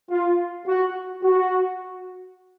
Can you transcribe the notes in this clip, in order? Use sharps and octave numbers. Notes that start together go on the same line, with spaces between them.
F4
F#4
F#4